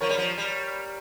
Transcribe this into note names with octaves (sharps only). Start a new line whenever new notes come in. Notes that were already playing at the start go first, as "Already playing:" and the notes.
F3 A#4 C#5
G3
F3
G3